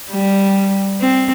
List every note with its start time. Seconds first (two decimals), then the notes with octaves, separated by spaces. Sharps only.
0.11 G3
1.01 C4